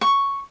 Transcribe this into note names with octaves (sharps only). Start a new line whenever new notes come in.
C#6